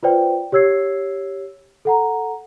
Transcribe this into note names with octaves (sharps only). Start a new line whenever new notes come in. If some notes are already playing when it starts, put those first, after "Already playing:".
F4 B4 C5 D5 G5
G4 C#5 E6 G#6 C7
A4 F#5 A#5